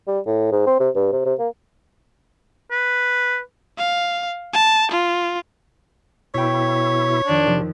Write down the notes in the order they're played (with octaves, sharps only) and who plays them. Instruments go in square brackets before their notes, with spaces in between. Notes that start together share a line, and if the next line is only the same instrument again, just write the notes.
[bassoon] G3
A2
G#2
C4
C3
G2
C3
C3
A#3
[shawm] B4
[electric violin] F5
A5
F4
[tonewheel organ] B2 E4 [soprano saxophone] C#5 [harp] G5 C#6
[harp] F2 D#3 B6 [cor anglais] D4
[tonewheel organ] C3 [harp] F3